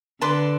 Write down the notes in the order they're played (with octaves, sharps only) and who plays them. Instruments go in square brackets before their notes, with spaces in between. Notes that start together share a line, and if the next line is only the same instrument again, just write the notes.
[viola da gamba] D3 [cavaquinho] B4 D5 A5 C6